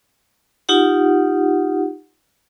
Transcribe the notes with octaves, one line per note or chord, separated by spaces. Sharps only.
D#4 F4 G4 F#5